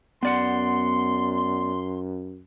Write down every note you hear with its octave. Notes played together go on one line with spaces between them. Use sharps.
F#2 B3 D5 F#5 C6